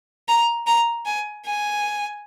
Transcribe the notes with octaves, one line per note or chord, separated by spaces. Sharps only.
A#5
A#5
G#5
G#5